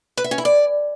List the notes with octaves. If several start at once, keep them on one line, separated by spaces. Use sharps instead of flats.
B4
E5
C#4
E4
D5